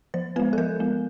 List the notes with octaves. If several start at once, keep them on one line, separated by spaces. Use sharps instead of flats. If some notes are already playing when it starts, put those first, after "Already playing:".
F3 C5
G#3 B3 B4
A4
F3 A#4
G#3 B3